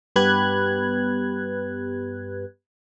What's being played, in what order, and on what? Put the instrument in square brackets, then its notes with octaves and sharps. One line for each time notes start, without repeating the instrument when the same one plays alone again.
[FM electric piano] G2 B3 G4 B4 F#6 G#6